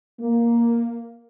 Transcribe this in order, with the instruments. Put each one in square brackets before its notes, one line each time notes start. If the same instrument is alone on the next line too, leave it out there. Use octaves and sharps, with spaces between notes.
[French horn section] A#3